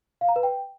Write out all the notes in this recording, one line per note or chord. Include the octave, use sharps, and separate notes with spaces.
F5
A#5
B4
G5